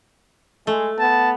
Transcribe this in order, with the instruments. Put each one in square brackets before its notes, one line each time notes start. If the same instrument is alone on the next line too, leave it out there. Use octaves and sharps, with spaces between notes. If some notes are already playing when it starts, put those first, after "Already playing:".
[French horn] G#3 [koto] A3
[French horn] B3 [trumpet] A5